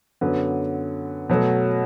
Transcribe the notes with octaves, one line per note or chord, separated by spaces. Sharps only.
F#2 D3 F#3 B3
B2 F#3 A3